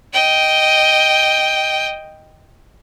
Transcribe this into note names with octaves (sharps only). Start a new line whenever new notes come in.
D#5 G5